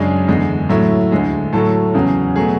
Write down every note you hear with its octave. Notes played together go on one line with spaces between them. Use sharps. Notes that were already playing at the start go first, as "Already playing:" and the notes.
Already playing: F#2 C#3 G#3 D4
E2 D3 G#3
A2 F#3 A3 E4
D2 D3 G#3
A2 F#3 A3 A4
E2 C#3 F#3
B2 F#3 A3 G#4